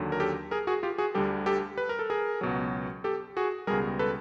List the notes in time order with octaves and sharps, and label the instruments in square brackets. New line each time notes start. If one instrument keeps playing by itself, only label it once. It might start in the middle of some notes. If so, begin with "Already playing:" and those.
Already playing: [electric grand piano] D#2 D3 F#3
A#4
G4 A4
G#4 A#4
F#4 G#4
F4 G4
F#4 G#4
D2 D3 G3 G4 A4
G4 A4
B4
A#4
A4
G#4 A#4
C#2 B2 F#3
G4 A4
F#4 G#4
C#2 B2 G3 G#4 A#4
A4 B4